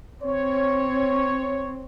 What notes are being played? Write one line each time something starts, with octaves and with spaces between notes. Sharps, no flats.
C4 C#5